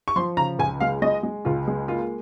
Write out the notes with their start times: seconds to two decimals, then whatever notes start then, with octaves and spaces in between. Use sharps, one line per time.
0.08 C#6
0.16 F3 C6
0.37 C#3 A#5
0.59 C#2 G#5
0.80 G#3 F5
1.02 G#3 D#5
1.23 G#3
1.45 C#2 F4
1.67 G#3
1.88 A#3 F4